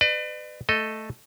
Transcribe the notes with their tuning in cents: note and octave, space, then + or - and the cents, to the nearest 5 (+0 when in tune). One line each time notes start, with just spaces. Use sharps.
B4 +30 D5 +40
A3 +0 A4 +0 D#5 +0